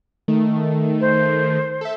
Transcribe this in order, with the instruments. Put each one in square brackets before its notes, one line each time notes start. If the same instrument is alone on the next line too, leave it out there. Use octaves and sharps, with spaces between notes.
[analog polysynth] D#3 A3
[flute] C5
[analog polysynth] A4 E5